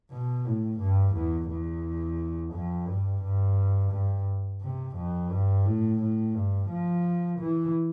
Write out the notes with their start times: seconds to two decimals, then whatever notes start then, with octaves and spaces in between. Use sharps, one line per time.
0.11 B2
0.45 A2
0.79 G2
1.14 E2
1.48 E2
2.54 F2
2.87 G2
3.22 G2
3.91 G2
4.61 C3
4.96 F2
5.31 G2
5.65 A2
6.00 A2
6.34 G2
6.69 F3
7.39 E3